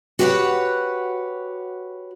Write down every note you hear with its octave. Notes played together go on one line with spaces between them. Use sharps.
F#4 G4 B4 C#5 E5 F#5